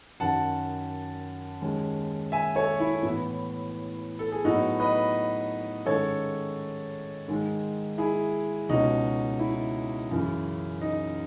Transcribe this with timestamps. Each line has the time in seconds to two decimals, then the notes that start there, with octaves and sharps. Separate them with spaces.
0.20 F#2 D#3 F#3 F#5 A5
1.61 D#2 D#3 G#3 C#4
2.32 E5 G#5
2.55 A4 C#5
2.80 E4
3.03 A2 E3 B3
4.19 A4
4.32 G#4
4.45 A2 F#3 B3 D#4 F#4
4.80 B4 D#5
5.86 G#2 D#3 G#3 C#4 A4 C#5
7.28 G#2 D#3 G#3
7.98 E4 G#4
8.69 C#2 B2 G#3 C#4 D#4 F#4
9.39 E4
10.11 F#2 C#3 E3
10.81 D#4